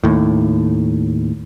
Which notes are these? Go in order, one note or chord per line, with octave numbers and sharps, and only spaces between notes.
D#2 A2